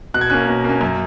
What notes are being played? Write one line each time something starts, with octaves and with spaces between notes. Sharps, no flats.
B2 F#6
G#6
A#3 C#4 F#6
B2
A#3 C#4
F#2